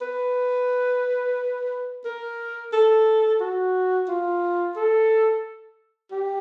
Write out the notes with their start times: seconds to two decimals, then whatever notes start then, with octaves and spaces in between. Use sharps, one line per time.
0.01 B4
2.05 A#4
2.73 A4
3.40 F#4
4.08 F4
4.76 A4
6.11 G4